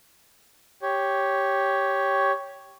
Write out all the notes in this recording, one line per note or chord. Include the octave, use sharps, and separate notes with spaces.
G4 C#5